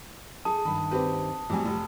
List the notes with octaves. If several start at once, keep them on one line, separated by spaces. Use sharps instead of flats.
G#4 A4 A5 D#6
G2 D#3 B5
C4 G4 B4
F2 A2 G3 F#4 G#5
F1